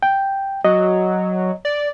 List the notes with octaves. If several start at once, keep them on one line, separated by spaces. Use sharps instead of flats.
G5
F#3 D#5
D5